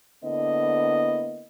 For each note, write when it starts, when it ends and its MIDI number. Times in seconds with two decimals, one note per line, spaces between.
0.24 1.47 50
0.24 1.47 58
0.24 1.47 59
0.24 1.47 64
0.24 1.47 75